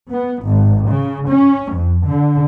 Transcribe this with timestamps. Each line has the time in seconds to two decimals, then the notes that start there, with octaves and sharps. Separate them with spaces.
0.10 B3
0.43 G#1
0.90 C#3
1.28 C#4
1.72 F2
2.04 D3